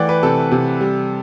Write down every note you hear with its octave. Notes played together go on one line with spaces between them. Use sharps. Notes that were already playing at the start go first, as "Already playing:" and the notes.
Already playing: E3 A3 D5 F#5 G5
B4
C3 A4
C3
G3